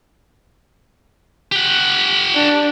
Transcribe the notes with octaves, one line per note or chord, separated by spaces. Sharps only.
G4 F#5
D4